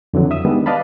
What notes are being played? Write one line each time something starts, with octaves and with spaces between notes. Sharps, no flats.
F2 D3 E3 F#3
E5 D#6 E6
D#3 G3 G#3 B3 D4
B4 D5 D#5 F5 A5 B5